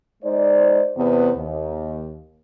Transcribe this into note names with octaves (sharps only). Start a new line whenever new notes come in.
G#3 D#4 C5 D5
E2 C3 B3
D#2